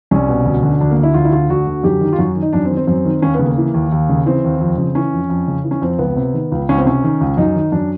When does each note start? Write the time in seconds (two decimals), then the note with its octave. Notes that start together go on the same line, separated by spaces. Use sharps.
0.11 C2 C#4
0.28 B2
0.45 D2
0.63 D3
0.80 D2 D4
0.91 A#3
0.98 D3
1.03 E4
1.14 D2 F4
1.25 E4
1.32 D3 F4
1.50 D2 F#4
1.67 D3
1.83 F#2 G4
2.01 D#3
2.13 F4
2.19 F#2 F#4
2.36 D#3
2.42 D#4
2.53 F#2 D4
2.65 C4
2.70 D#3
2.77 C4
2.87 F#2 C4
3.05 D#3
3.22 D#2 C#4
3.35 C#3 B3
3.46 A#3
3.58 E3
3.74 D#2
3.92 D#2
4.09 C#3
4.26 E3 C4
4.44 D#2
4.61 F2
4.78 C#3
4.95 E3 C#4
5.13 F2
5.30 F2
5.48 C#3
5.64 E3
5.71 C#4
5.81 F2 C4
5.99 C#2 B3
6.16 C3
6.34 D#3
6.52 C#2
6.69 C#2 C#4
6.78 C4
6.85 C3 C#4
7.04 D#3
7.21 C#2
7.37 F#2 D#4
7.55 D#3
7.72 F#2 D4